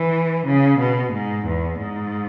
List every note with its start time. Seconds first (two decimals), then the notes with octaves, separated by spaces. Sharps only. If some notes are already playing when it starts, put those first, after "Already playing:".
Already playing: E3
0.46 C#3
0.79 B2
1.12 G#2
1.45 E2
1.79 G#2